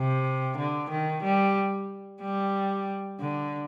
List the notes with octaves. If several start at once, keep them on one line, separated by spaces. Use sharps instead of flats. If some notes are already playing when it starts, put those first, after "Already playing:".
Already playing: C3
D3
D#3
G3
G3
D3